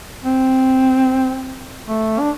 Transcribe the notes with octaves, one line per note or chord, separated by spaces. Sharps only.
C4
A3
D4